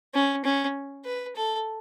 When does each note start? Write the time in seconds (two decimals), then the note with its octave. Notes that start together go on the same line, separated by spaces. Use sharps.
0.14 C#4
0.44 C#4
1.05 B4
1.35 A4